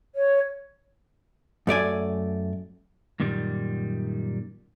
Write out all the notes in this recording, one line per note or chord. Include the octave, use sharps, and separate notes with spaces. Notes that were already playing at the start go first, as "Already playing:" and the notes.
C#5
F#2 A3 D5 G#5
F#2 A#2 D#3 G3